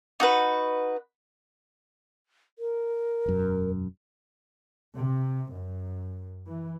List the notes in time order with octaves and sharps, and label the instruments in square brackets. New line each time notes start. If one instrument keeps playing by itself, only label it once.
[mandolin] D#4 F#4 B4
[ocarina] A#4
[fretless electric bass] E1 F#2
[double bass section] C3
F#2
E3